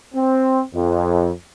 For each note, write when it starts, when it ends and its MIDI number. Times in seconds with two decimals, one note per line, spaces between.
0.14 0.62 60
0.74 1.32 41